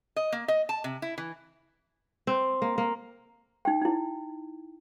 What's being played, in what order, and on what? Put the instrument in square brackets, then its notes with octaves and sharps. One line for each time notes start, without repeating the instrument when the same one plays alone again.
[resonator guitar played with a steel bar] D#5
A#3
D#5
A5
C3
E4
E3
[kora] C4
A#3
A#3
[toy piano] D#4 G5
D#4 E4